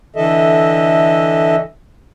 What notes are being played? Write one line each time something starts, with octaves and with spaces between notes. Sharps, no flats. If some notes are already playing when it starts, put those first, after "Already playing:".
D3 E3 A4 D#5 E5